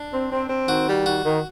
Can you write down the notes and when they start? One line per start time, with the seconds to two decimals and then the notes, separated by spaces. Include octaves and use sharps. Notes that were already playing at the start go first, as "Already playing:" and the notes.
Already playing: D4
0.13 C4
0.31 C4
0.49 C4
0.68 D#3 F#4
0.88 G3
1.06 D#3 F#4
1.24 D#3